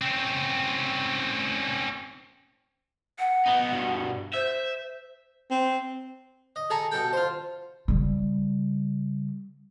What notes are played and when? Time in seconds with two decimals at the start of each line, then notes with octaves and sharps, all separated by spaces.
0.01 C4 C#4
3.19 F#5
3.46 B3 D#4
3.71 G2 B2
4.33 C5 E5
5.50 C4
6.56 D#5
6.70 G#4 A4 G#5 A#5
6.92 B2 A4 G5
7.13 F4 C5
7.88 C#3 G3